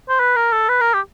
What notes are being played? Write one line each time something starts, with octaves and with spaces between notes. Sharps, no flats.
C5
B4
A#4
A4
B4
A#4
G4